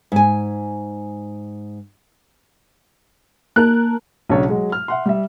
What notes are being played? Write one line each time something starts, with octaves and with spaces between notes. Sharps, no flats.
G#2 G#5
A#3 A#4 A5 F#6
B1 C#3 D4 C#5 A5
F#3 G#3
F6
E5 F#5 C6
G3 E5